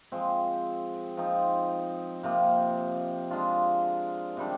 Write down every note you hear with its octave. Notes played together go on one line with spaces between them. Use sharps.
F3 G#3 C4
F3 C4 D#4
C3 F3 A#3
F3 G#3 D4 F4
C3 D#3 G3 D4